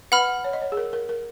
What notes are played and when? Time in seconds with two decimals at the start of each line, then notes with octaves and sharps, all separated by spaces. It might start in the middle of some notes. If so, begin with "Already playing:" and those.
0.12 B4 F#5 B5 F6
0.44 C#5
0.53 D#5
0.62 C#5
0.72 G#4
0.77 A#4
0.93 A#4
1.09 A#4